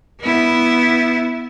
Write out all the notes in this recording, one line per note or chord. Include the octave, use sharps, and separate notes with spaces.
B3 E4